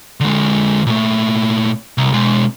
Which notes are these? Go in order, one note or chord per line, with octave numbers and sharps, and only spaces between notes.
D3 G#3
A#2 A3
C2
B2 G#3